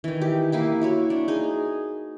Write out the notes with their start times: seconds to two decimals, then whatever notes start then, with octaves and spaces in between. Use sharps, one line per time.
0.04 D#3 E3
0.21 G4
0.52 A#3 E4 B4
0.81 E4 F#4 C#5
1.10 D4
1.28 D#4 G#4